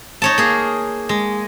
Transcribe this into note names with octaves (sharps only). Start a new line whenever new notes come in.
D#4 C#5 A5
A#3 G#4
G#3